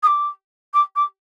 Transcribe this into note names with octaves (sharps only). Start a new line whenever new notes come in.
D#6
D6
D6
D6